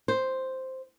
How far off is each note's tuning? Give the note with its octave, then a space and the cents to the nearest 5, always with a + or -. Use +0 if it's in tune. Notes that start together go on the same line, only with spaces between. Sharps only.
C5 +0